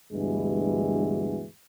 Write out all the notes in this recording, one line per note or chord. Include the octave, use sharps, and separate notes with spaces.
D2 G2 B2 E3 G#3